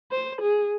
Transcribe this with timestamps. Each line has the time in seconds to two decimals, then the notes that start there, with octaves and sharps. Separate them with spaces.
0.12 C5
0.41 G#4